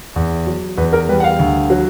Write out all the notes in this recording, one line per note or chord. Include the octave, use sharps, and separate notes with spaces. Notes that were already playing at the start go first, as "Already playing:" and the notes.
E2
F#3
E2 B4
A#4
G3 B4
F#5
F5
D2
F#3